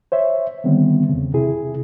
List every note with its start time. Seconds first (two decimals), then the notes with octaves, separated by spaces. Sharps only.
0.12 C5 C#5 E5
0.64 D3 D#3 G3 B3 C4
1.09 E2 C#3
1.34 C3 E4 G#4